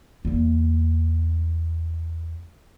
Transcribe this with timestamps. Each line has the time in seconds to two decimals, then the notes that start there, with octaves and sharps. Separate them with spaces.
0.25 E2 A#3